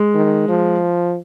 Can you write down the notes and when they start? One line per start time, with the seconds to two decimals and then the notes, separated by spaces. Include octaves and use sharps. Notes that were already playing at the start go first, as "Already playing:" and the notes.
Already playing: G#3
0.15 D#3
0.48 F3